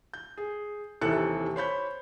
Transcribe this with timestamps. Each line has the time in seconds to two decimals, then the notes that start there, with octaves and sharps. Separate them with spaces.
0.14 G6
0.37 G#4
1.01 D#2 C3 E3 A4 F#6 C#7
1.56 C5 C#5 B5 G6